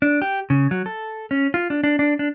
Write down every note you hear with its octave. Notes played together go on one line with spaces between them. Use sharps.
D4
G4
C#3
F#3
A4
C#4
F4
D4
D4
D4
D4